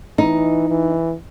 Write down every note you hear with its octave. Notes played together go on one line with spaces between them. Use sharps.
E3 D#4
E3